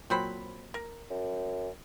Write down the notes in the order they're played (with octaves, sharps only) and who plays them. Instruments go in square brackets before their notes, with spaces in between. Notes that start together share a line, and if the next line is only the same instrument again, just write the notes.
[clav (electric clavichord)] A#2 F#3 [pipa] C4 C5 B5
[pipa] A#4
[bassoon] F#2